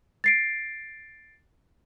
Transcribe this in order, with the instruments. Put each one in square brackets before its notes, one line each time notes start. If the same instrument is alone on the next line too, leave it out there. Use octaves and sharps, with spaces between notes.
[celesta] A6 C7 D7